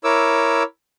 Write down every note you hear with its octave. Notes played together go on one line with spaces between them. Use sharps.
E4 A#4 C#5 D6 E6